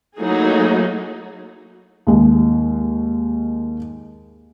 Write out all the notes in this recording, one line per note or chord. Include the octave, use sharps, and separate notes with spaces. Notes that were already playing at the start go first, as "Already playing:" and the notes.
F#3 A3 A#3 D#4 E4 G#4
D#2 G#3